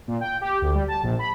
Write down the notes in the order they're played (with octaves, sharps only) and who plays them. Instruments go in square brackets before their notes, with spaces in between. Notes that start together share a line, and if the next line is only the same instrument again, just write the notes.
[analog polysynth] A#2
G5
G4
D2
G3
A5
A#1
B5